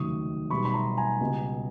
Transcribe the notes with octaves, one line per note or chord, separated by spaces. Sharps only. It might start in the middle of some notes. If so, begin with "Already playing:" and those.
Already playing: F1 D#2 C#3 F#3 A3 C#6 D#6
B1 B2 G3 B5 C#6
B5
A#5 C6
G#5 A#5
C#2 B2 G3